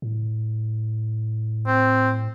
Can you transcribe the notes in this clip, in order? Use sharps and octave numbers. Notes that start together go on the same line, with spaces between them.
A2
C4